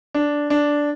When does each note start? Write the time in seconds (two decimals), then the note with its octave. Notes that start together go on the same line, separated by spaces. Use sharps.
0.14 D4
0.50 D4